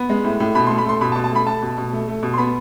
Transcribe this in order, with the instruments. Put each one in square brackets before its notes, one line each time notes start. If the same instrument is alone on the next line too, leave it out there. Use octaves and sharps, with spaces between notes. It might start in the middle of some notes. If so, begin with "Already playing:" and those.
Already playing: [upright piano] B3
G#3
A2
A2
B2 B5
C6
A3
B5
A3 C6
B2 B5
A5
B2
A5
A3 B5
A3 A5
B2
B2
A3
A3
B2
C6
B3 B5